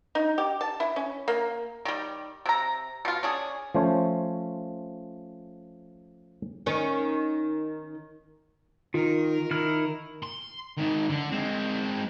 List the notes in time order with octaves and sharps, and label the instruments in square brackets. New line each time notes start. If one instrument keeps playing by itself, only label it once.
[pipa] D#4
G4
A5
E4
C#4
A#3
D#3 G3
C3 A#5
B2 F4
C#4 D4 G#4
[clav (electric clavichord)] F3 A3 C#4 C5 C#5
[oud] D#3 C#4
[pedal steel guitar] D#3 [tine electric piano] F4 [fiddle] A#4
[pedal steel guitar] D#3 E4 F6
[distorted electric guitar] C6
G#2 D#3
D3
G#3 C4